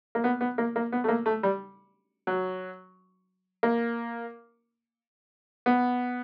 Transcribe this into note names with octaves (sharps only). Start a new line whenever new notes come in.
A#3
B3
B3
A#3
A#3
B3
A3
A#3
A3
G3
F#3
A#3
B3